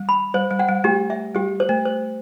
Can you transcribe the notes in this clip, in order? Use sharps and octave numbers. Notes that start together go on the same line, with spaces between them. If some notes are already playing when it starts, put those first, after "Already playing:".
Already playing: G3
B5
G3 C5
G3
F#5
G3
A3 G4
E5
G3 G4
C5
A3
C5